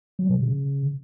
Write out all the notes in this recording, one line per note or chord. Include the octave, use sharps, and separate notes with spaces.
F#3
B2
C#3